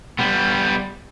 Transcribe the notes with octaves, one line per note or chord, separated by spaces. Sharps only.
G3 B3